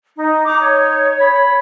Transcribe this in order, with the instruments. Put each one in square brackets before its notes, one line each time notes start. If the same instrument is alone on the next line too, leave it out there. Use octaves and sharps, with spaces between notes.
[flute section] D#4
[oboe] D#4 [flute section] A#5 D6
[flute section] C#5
[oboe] B5